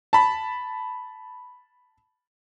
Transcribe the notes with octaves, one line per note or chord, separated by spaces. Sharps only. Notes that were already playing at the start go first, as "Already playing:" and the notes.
A5 B5